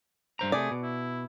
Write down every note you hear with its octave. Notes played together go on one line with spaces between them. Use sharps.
G2 C5 A#5
C3 A3 G#4 D5
B2
E4